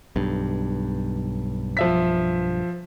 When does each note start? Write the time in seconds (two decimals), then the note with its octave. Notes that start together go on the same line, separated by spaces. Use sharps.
0.16 B1 G2
1.77 F3 E5 B6